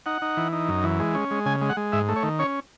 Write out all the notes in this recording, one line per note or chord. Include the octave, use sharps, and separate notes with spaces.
D#4 F#5
D#4
E3
D#4
F#2
E3
G#3
C#4
G#3
C#3 G#5
G#3
F#5
G#3
G#2 E5
A3
C#5
D#3
C#4 C#5